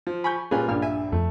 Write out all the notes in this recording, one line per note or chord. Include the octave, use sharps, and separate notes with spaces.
F3
G#5 B5 C#6 G6
A#2 G3 C#4 F4 G#4 A#4 B4 G#5
A#1 G2 A#3 F6
E5 G#5
F2 A3